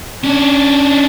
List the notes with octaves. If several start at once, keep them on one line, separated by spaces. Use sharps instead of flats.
C#4 D4